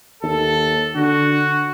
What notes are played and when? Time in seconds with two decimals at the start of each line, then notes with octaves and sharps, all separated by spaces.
0.23 D#2 A4
0.95 D3 F#4